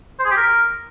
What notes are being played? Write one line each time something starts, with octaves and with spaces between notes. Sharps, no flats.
C5
G#4
G4
A#4